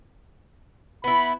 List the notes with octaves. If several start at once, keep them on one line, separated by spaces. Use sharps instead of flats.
B3 E4 B5